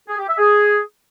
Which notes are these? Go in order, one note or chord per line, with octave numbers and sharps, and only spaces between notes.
G#4
G4
E5
G#4